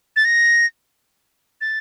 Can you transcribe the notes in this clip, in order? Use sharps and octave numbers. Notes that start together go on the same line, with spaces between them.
A6
A#6
A6